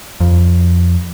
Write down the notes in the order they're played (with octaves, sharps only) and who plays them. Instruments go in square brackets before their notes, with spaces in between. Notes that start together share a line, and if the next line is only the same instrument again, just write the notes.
[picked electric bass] F2